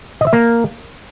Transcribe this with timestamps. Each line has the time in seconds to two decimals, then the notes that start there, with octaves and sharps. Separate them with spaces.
0.21 D#5
0.27 E5
0.33 A#3